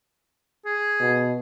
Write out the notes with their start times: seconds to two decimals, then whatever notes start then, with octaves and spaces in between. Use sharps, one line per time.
0.65 G#4
1.00 B2